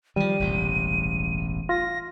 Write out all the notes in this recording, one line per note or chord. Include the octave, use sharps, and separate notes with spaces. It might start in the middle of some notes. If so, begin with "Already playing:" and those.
D#3 F3 G3 D#7
E1 A1 C3
F4 A#6